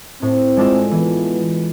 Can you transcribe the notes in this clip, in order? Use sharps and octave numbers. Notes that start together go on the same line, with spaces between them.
A2 C4
G#3 D4 F4 A4
E3 B3